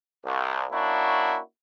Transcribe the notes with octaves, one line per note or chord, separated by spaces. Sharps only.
C2
A#3 C#4 D4 E4 F#4